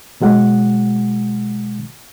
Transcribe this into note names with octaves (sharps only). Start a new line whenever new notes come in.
B2 F#3 G#3 F#5